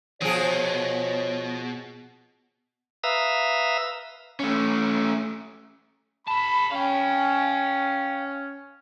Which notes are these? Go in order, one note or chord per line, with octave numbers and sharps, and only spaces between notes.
B2 F3 G#4 C#5
B4 E5 F5 A#5 D#6 E6
A3 C#4
G#4 A5 B5
C#4 F5 G5